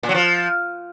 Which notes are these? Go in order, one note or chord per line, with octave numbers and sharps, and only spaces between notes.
A#2
F#3
F3